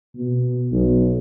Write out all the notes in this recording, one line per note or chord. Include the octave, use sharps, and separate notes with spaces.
B2
B1